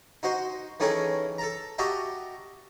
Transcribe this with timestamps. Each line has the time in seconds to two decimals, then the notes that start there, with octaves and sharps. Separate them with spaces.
0.23 D#4 F#4 C5
0.80 D#3 E3 A3 C#4 G#4 A#4
1.38 A4 A5 A#5
1.78 F#4 G4 D#5 E5 A5 A#5